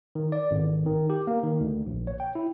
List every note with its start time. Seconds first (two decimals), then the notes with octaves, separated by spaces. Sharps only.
0.15 D#3
0.32 D5
0.51 G#1
0.86 D#3
1.10 G4
1.27 A#3
1.43 D#3
1.61 D2
1.86 A#1
2.07 C#5
2.20 G5
2.35 E4